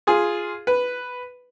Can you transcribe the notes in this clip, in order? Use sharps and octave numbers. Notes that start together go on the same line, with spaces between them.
F4 G#4
B4